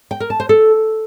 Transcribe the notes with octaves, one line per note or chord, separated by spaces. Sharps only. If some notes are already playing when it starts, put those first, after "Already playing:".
G5
A#4
A5
C5
A4